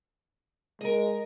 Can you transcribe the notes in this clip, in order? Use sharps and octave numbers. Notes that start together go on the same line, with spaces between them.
G#3 A#4 D#5